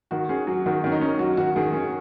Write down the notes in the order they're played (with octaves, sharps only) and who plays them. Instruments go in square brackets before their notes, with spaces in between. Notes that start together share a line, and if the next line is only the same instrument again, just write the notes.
[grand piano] D#3 [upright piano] F#4
[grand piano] C#4 [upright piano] G#4
[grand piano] F#3 [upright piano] F#4
[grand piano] D#3 [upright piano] F#4
[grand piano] D#3 [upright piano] C#4
[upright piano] D#4
[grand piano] C#4
[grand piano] F#3 [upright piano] F#4
[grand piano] D#3 [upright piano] F#4
[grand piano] D#3 [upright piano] G#4
[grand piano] C#4 [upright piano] G#4